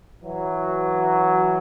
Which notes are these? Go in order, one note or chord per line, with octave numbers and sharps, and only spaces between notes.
E3 F#3